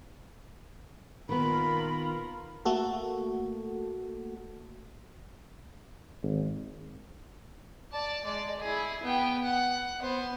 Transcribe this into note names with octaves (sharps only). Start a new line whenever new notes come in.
A#2 D#3 B3 F4 A#4 B5
A3 A#3 F#4 A4
G#1
D5 A5
G#3 D5
E4 G#4
B3 G5
F#5
B3 C5